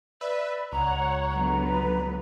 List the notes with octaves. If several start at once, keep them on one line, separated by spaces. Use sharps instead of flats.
B4 D5 E5
C#2 C#5 F#5 A#5
D3 F#3 B3 A#5
B4